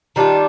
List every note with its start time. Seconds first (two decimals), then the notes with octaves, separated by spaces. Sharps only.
0.16 D#3 G3 D4 F4